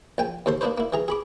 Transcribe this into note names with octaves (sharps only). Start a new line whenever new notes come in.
A#1 G5 G#5
D#2 A4 C5 C6
A#3 D4 D#4 B4 C5
A#3 E4
E3 G#4 A#5
G#4 B5 D6